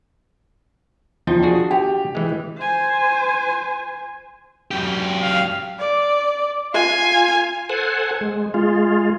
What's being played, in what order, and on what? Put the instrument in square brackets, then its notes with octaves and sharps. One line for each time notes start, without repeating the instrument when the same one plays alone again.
[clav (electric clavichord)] E2 D#4 G5 [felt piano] F3
[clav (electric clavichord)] D4 F#4 G#4
[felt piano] G4
[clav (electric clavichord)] E3 G#3
[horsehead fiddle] C5 G#5
[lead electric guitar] F#2 G4
[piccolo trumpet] F5
[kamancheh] D5
F4 G#5
[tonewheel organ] A4 C5 F#5 G#5
G#3
G#3 F4